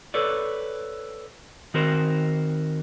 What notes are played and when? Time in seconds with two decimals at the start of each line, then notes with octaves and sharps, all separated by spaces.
0.14 A4 B4 C#5 D5
1.74 D#3 C4 F#4 A#4 C5